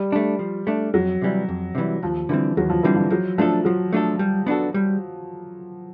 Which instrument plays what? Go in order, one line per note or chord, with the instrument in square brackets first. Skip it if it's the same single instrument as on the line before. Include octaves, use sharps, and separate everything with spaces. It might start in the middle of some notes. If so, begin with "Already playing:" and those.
Already playing: [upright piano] G3
[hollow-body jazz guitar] A3 D4
F3
A3 D4
[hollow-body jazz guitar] F2 [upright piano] F#3
[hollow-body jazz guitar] C3 E3 G3
F2
C3 E3 G3
[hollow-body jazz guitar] D#2 [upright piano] F3
[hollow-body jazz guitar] D3 G3 C4 [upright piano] E3
[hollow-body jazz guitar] D#2 [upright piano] F#3
[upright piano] F3
[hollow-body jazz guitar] D3 G3 C4 [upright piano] E3
[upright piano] F3
[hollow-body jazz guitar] F3 [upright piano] F#3
[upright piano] F3 [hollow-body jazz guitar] A3 D4 F4 A4
[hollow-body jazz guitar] F3 [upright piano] F#3
[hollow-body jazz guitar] A3 D4 F4 A4
G3
B3 D4 F#4 A4
G3